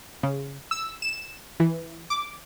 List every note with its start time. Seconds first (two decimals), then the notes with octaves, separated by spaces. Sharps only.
0.23 C#3
0.71 E6
1.02 E7
1.60 E3
2.10 D6